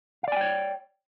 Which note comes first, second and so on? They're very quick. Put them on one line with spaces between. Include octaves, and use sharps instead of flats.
F5 D5 G#5 G5 C#5